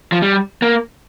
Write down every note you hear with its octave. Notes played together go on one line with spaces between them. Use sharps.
F3
G3
A#3